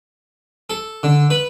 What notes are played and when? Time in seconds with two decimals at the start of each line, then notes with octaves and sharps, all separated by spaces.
0.70 A4
1.03 D3
1.30 B4